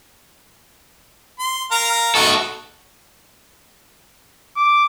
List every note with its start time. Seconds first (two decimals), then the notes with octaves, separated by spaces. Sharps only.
1.39 C6
1.71 A#4 F5 A#5
2.15 F#4 A4 D#5 C#6
4.56 D6